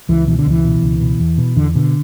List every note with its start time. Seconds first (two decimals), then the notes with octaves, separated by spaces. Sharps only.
0.09 C#2 E3
0.27 B2 E3
0.39 D3
0.46 C#2 E3
0.65 B2
0.82 C#2
1.01 B2
1.20 E2
1.38 B2
1.56 E2 D3
1.75 B2 D3